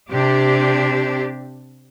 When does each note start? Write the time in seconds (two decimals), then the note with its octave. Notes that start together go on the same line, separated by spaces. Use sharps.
0.11 C3 D4 G4